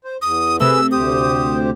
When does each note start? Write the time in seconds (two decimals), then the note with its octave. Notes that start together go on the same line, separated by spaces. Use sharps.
0.05 C5
0.22 E2 D#6
0.60 C3 A3 G#4 B4 E6
0.92 D2 G4 C5 D#6